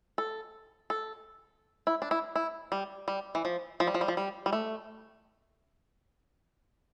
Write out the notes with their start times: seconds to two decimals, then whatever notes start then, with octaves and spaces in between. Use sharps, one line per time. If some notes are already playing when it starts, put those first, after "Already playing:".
0.18 A4
0.90 A4
1.87 E4
2.02 D4
2.11 E4
2.36 E4
2.72 G3
3.08 G3
3.35 E3
3.45 F3
3.80 F3
3.87 G3
3.94 F3
4.01 G3
4.08 F3
4.17 G3
4.46 G3
4.53 A3